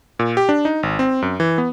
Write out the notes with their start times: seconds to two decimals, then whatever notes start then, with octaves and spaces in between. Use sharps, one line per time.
0.19 A#2
0.37 G4
0.49 D4
0.65 D#4
0.83 G#1
0.99 C4
1.22 F#2
1.40 E3
1.58 B3